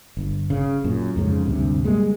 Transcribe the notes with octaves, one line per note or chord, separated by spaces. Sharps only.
G1
C#3
F#2 A#2
F2 G#2 C#3
D2 G2 C3
G3 G#3 A#3